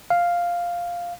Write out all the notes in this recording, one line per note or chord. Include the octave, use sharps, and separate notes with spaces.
F5